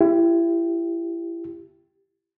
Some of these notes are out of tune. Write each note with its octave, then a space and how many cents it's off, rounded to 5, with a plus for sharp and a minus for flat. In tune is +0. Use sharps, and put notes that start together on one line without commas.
E4 +30 G4 +0